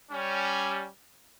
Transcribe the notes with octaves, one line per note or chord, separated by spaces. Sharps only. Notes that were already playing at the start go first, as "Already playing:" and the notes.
G3 C#4